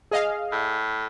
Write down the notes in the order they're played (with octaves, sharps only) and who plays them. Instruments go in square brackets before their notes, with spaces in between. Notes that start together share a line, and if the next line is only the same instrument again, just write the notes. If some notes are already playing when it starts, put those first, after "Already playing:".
[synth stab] G#4 D#5 F5
[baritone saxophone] A2